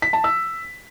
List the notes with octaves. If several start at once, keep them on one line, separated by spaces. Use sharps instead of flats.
B6
A5
E6